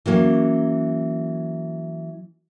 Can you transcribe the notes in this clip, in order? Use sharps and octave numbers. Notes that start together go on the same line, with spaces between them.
E3 F#3 A#3 C#4